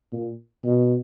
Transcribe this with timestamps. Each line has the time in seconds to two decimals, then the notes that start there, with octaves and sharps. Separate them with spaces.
0.13 A#2
0.64 B2